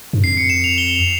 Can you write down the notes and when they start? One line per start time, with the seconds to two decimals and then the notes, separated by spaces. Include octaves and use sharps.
0.13 G2
0.24 F2 C7
0.37 C#7
0.50 E7
0.64 F7
0.78 G7
0.95 F7